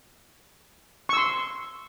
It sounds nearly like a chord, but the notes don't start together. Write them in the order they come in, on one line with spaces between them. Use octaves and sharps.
C#6 E6 C6